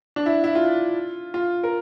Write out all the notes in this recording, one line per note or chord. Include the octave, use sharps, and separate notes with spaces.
D4
E4
E4
F4
F4
A#4